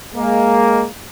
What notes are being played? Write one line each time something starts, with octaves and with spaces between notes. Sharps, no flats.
G#3 A#3